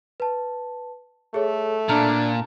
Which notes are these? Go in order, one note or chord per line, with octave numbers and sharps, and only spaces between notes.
B4 A5
A3 G#4 A4 C#5
A#2 D4 A5 A#5 F6